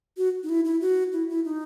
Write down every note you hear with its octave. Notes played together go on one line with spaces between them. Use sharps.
F#4
D#4
E4
E4
F#4
E4
E4
D#4